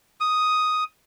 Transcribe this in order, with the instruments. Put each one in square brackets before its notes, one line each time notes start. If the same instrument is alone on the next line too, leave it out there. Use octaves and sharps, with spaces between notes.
[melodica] D#6